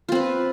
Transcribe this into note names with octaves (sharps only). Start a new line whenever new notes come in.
C4 F4 B4